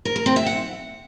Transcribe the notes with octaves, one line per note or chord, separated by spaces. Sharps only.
A#4
A#4
C4
E5
F#5